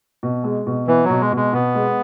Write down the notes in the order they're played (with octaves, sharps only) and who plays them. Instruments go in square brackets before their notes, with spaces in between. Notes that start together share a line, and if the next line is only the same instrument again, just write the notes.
[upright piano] B2
G#3
B2
[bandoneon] E3 [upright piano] B3
[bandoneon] F#3
[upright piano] B2
[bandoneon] G#3
[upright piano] B2 [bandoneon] G#3
[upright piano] B2 [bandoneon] B3
[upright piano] G#3